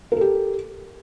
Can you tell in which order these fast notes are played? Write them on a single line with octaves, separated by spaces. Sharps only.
A#4 A4 G4